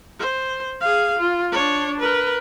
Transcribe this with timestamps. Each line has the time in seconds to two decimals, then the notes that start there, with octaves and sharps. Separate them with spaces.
0.19 C5
0.81 G#4 F5
1.19 F4
1.52 D4 C#5
2.00 A#4 B4